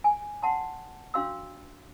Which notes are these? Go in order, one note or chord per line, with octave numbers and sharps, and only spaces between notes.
G#5
F#5 A5 C6
D4 F#4 F5 C6 E6